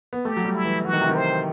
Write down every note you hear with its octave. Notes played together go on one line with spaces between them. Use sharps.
B3
A3 G4
F#3
G3
E4
E3
E3 F#4
D#3
C3
D#3
C5